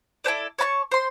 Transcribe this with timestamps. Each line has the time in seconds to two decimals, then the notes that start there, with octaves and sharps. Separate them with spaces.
0.24 E4 A4 C5 D5
0.58 C#5 A5 B5 C#6
0.92 C5 C6